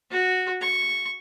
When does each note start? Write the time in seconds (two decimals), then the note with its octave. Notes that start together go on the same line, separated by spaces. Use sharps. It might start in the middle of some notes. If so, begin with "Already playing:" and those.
0.11 F#4
0.61 C#6